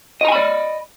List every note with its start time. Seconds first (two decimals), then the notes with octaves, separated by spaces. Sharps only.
0.21 D#5
0.25 A#5
0.28 G#5
0.32 B5
0.36 D5